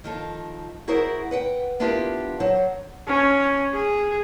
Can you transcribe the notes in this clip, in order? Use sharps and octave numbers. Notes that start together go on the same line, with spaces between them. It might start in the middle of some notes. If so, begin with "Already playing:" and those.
D#3 F3 A4
E4 F#4 G#4 A#4 C5 F#5
B4 F#5 G5
B3 D4 E4 F4 G4 A#4
F#3 C5
C#4
G#4